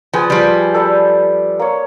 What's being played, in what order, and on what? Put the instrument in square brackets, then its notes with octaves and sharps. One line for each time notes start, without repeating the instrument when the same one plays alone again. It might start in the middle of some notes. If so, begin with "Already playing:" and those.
[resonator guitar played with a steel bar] F3 [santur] G#4 B4
[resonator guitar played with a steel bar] F3 G3
[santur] A4 D5 B5
A#3 C#5